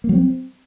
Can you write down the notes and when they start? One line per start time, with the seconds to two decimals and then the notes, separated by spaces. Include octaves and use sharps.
0.04 A#3
0.09 F#3
0.14 C4